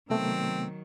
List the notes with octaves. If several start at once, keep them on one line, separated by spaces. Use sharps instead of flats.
C3 D#3 F#3 A3 B3 C4